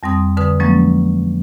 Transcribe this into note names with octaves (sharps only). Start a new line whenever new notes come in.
F2 G3 C4 D#6
F2 D3 B4 D#6
F3 F#3 G#3 A#3 C#4